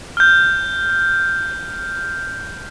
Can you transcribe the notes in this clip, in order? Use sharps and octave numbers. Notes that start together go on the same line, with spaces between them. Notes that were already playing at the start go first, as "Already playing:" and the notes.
F6 G6